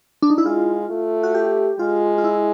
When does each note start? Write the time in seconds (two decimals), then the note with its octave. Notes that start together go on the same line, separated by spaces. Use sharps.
0.22 D4
0.30 D#4
0.38 E4
0.46 G#3 F4
0.91 A3
1.23 F#4
1.35 G4
1.79 G#3 F4
2.18 F4
2.24 E4